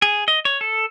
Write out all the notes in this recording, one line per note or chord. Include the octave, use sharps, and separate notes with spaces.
G#4
D#5
C#5
A4